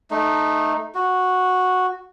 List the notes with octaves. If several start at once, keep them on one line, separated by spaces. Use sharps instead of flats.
A3 D#4
F#4